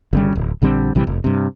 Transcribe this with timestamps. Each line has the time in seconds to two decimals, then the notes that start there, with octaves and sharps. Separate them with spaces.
0.13 G1 C#3 G3
0.35 D1
0.62 A#1 D3 G3 C4
0.95 A#1 C3 E3 G3
1.07 F1
1.24 G2 C3